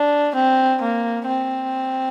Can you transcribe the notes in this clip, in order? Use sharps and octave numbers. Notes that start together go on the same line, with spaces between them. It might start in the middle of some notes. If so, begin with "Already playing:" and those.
Already playing: D4
C4
A#3
C4